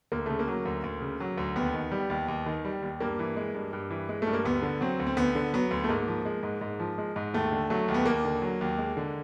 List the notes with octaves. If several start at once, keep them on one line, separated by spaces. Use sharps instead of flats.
D2 A#3
C#3 A3
A#3
F#3
D2
D2
C#3
F#3
D2
D#2 B3
D#3
G3
D#2
D#2
D#3
G3
D#2
G2 A#3
E3
G#3
G2
G2
E3
G#3
G2 A3
A#3
D2 B3
D3
F#3 C4
D2
C4
D2 B3
D3
F#3 B3
D2
A3
G#2 A#3
F3
G#3
G#2
G#2
F3
G#3
G#2
D#2 A3
D3
F#3 A3
D#2
B3
D#2 A#3
D3
F#3
D#2
G#3
D3